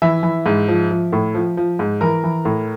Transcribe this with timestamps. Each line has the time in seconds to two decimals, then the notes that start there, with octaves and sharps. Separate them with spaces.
0.02 E3 E5
0.23 E3
0.46 G#2
0.68 F3
0.91 F3
1.13 A2
1.35 F3
1.57 F3
1.79 G#2
2.01 E3 A#4
2.24 E3
2.45 A2